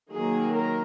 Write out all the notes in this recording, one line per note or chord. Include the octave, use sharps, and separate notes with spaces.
D#3 F#3 A#3 G#4
A#4